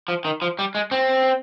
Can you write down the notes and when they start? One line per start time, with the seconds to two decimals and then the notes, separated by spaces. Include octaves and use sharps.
0.08 F3
0.25 D#3
0.42 F3
0.59 G3
0.75 G#3
0.91 C4